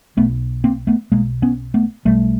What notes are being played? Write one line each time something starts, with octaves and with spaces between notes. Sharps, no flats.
B1 B2 A3 B3
A#3 C4
A3 B3
B1 B2 G#3 A#3
B3 C#4
A3 B3
B1 B2 G3 A3